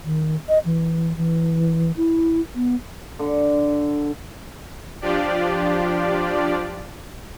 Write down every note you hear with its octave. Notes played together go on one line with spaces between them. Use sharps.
D#3
D#5
E3
E3
E4
B3
D3
F3 D4 F4 G4 D5